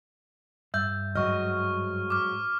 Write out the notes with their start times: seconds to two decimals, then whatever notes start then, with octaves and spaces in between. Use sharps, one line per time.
0.74 G2 E5 E6 G6
1.16 G#2 F#3 D#5 C#6 F6
2.10 D6 F6